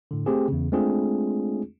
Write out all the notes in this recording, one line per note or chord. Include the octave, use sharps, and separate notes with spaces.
A2 D3
A3 C4 G4 G#4
E2 C#3
G#3 A3 C4 D4 F4 G#4